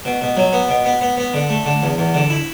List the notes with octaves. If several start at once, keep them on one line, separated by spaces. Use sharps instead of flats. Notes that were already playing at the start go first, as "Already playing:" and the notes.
B2
B2
F#3
B3
B2
B3
B3
B3
D3
A3
D3
E2
E2
D3
E4